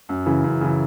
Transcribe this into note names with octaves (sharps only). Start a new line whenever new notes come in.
F#2
C#3 E3
F#2
C#3 E3